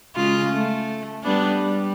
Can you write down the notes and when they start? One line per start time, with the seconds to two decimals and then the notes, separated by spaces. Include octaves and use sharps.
0.15 C#3 G#3 F4
0.51 A3
1.23 G3 B3 D4
1.59 G3